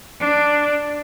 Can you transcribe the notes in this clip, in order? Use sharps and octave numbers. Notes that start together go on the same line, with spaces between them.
D4